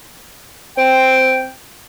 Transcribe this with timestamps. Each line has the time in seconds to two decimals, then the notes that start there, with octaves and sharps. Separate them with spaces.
0.78 C4 G5